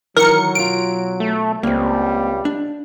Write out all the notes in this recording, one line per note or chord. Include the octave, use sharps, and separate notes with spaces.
D#3 E3 F#3 A#4 C#7
B1 F4 D7
A3
C#2 G3 A#3 C4
D4